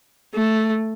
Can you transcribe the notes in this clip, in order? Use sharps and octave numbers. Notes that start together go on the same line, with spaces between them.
A3